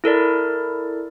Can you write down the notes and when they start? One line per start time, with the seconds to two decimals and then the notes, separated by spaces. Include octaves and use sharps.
0.04 E4 A4 A#4 D5